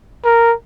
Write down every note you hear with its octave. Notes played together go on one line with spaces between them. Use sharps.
A#4